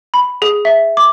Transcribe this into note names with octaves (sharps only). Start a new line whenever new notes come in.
B5
G#4
E5
D6